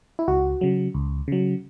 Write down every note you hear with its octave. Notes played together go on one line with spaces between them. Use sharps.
E4
C#2 F#4
C#3 F#3
C#2
C#3 F#3